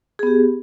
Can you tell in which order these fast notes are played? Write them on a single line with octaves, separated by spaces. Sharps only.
G#4 B3 G4